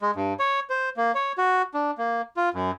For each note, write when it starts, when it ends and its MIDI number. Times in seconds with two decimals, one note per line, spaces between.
0.02 0.11 56
0.16 0.34 43
0.39 0.60 73
0.70 0.89 72
0.97 1.12 58
1.15 1.32 73
1.38 1.62 66
1.74 1.91 62
1.98 2.22 58
2.37 2.49 65
2.54 2.71 42